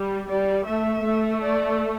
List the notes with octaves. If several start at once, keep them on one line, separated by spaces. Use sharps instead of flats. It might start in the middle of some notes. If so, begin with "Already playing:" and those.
Already playing: G3
G3 D5
A3 E5
A3
D5